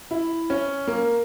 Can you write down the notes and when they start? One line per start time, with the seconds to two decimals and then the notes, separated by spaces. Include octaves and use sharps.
0.11 E4
0.50 C#4
0.87 A#3